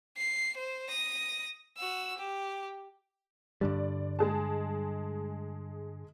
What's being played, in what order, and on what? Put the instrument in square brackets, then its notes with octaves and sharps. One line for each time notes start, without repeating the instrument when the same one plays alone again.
[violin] C7
C5
D#6 A#6
F#4 E6
G4
[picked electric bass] G2 D3 G3 [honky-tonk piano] D5
[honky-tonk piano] G#3 G#4 A5